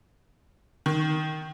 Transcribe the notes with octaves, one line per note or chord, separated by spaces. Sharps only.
D#3